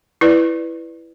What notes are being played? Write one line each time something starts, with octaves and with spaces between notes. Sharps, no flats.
E4 B4 D5